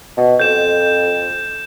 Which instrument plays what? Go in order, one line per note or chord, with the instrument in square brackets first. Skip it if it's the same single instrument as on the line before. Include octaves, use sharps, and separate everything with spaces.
[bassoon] B2
[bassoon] F2 [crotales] G6 E7